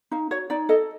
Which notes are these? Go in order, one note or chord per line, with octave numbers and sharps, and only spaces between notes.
D#4 F5
F#4 C#5
D#4 D5
A4 D#5